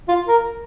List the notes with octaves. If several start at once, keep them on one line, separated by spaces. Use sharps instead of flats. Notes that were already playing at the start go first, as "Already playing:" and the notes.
F4
A#4